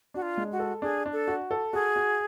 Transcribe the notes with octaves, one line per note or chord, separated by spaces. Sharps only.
D4 F#4
F4
G#3
F#4
A4
D4 G#4
D4
A4
F#4
A4
F#4 G#4
F#4